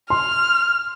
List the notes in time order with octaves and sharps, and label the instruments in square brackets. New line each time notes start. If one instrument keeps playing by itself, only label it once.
[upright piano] C6 [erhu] F6